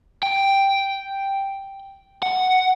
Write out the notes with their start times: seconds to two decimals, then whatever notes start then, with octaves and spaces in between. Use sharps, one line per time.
0.23 G5
2.22 F#5